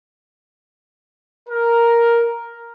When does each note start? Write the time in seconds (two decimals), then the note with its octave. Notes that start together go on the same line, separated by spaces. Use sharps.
1.48 A#4